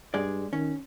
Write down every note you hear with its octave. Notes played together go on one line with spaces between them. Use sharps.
G2 G#3 G#4 D5
D#3 C#4